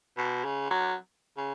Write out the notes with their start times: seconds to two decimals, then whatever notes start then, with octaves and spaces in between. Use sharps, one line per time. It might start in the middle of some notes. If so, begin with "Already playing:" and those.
0.18 B2
0.45 C#3
0.71 F#3
1.37 C#3